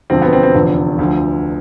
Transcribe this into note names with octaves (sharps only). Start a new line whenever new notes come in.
E1 D2 D3 F3 C4
B3
C4
C4
F1 E2 D3 F3
D2 D3 F3